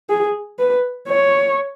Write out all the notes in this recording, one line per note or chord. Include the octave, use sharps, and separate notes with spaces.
G#4
B4
C#5